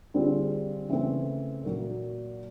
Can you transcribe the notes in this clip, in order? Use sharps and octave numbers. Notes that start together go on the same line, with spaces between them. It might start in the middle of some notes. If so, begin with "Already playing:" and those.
D3 G3 C4 F4 G#4
C#3 E3 A3 C4
A#2 F#3 A#3